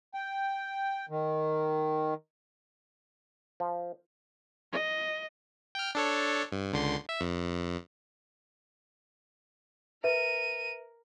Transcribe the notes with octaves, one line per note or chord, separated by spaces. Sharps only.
G5
D#3
F3
D#5
G5 F6
D4 A4 C#5
G2
C#2 D3 C6
E5
F2
A#4 B4 E5 D#7